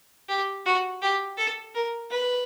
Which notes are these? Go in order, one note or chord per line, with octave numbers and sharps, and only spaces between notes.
G4
F#4
G4
A4
A#4
B4